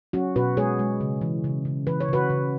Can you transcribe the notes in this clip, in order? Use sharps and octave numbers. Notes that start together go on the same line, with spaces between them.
F#3 C#4 F#4
B2 F#4 B4
G#3 G#4 C#5
G#3
C#3
E3
C#3
C#3
E3 B4
C#5
C#3 F#4 B4
C#3